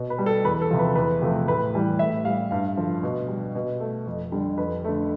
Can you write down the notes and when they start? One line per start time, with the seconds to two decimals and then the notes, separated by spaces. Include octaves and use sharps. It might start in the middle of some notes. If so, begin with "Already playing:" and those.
Already playing: B2
0.10 B4
0.19 G3
0.26 A4
0.44 E2 B4
0.62 A4
0.71 C3 F3
0.79 B4
0.95 E2 B4
1.22 C3 F3 A3
1.48 A2 B4
1.74 E3 G3
1.99 A2 E5
2.25 G3 F5
2.51 G2 F5
2.77 D3 F3
3.03 B2
3.28 G3
3.55 B2
3.80 A3
4.07 F2
4.32 D3 G3
4.58 F2 B4
4.85 D3 A3